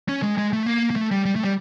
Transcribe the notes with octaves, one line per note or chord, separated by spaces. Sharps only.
C#4
G#3
G#3
A3
A#3
A#3
A3
G3
G3
A3
G3